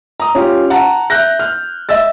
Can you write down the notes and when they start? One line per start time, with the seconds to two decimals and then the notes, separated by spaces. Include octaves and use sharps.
0.20 A#5 D#6
0.35 C#4 F4 G4
0.70 F#5 A5 A#5
1.10 E5 F#6 G6 A#6
1.39 F6
1.89 D#5 E5 E6 A6